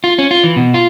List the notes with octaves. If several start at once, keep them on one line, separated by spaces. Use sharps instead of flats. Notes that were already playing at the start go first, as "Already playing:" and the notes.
F4
C#4
F4
E3
B2
F4